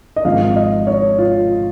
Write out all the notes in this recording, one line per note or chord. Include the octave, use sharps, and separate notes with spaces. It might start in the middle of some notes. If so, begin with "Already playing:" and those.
D#5
G#1 G#2 F3 G#3 F5
D#5
C#5
F4